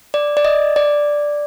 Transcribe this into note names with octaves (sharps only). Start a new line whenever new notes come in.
D5
D5
D#5
D5